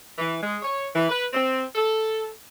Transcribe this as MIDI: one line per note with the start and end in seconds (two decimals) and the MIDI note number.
0.18 0.35 52
0.43 0.57 56
0.63 0.86 73
0.94 1.07 52
1.10 1.25 71
1.33 1.63 60
1.75 2.30 69